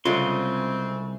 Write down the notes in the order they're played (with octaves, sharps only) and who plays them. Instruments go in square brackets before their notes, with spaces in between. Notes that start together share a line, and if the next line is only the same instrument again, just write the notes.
[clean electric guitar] C2 C6 [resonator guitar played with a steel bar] C#3 G#3 A3 [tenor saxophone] C4 [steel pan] F4